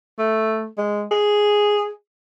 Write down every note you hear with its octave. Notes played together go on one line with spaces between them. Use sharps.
A3
G#3
G#4